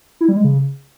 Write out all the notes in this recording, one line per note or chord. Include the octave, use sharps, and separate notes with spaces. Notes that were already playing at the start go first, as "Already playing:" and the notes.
E4
G3
G#3
C#3